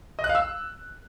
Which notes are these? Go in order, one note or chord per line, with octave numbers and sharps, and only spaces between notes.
D#5
F#6
F5
E6